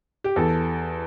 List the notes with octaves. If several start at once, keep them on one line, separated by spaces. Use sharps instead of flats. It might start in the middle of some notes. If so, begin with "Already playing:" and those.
G4
E2 A4